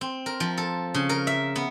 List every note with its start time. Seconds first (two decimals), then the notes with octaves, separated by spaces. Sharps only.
0.01 C4
0.26 A#4
0.40 F3
0.58 A4
0.94 C#3
1.09 A#4
1.27 E5
1.56 B3